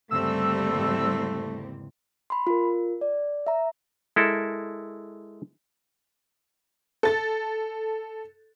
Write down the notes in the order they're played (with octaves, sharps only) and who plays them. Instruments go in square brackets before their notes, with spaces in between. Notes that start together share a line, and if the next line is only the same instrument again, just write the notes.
[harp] D2 G2 C#3 [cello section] G3 A#3 C4 [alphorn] A3 [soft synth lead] E6
[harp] E2 G#2
[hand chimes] B5 C6
F4 A#4
D5
E5 A#5
[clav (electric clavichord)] G#3 E4 A4 A#4
[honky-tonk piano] A4 A6